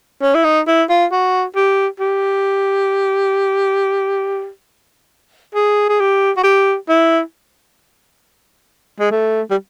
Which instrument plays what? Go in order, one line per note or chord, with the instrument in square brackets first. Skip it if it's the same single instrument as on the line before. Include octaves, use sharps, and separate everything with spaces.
[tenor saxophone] C#4
E4
D#4
E4
F4
F#4
G4
G4
G#4
G#4
G4
F#4
G4
E4
G#3
A3
G3